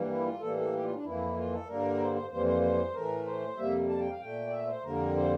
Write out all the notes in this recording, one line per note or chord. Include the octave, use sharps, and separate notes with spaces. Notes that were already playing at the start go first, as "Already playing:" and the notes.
Already playing: G2 E3 G3 A#3
E4
F4
A2 E3 G3 A#3 A4
A4
G4
F4
D4
F2 E3 A#3 E4
F4
A4
G2 D3 G3 A#3 A#4
C5
C5
F2 E3 G3 A#3 C5
C5
C5
A2 E3 A3 A#4
C5
F2 C3 G3 A#3 E5
A5
G5
F5
A#2 A3 G5
D5
E5
C5
F2 D3 G3 A#3 A#4
C5